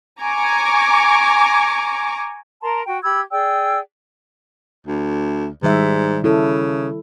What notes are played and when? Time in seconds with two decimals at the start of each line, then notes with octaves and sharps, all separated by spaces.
0.22 G#5 A#5 C#6 D6
2.61 A#4 A5 A#5 C6
2.86 F#4 G5
3.03 G4 B5 E6 G#6
3.31 G#4 D5 G5 E6
4.87 D2
5.63 G#2 D#3 G3 E5
6.24 C#3 E4 A4